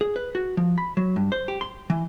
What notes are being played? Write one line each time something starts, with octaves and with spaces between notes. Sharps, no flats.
G#4
B4
F#4
F3
B5
F#3
G2
C5
G4
C6
E3